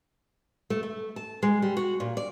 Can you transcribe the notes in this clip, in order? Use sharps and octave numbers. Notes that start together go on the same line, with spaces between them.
A3
A3
A5
G#3
G3
F#4
A#2
D5